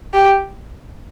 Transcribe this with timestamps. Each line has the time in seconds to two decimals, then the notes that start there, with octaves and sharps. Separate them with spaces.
0.14 G4